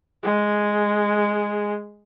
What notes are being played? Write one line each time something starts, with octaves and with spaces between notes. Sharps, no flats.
G#3 G#4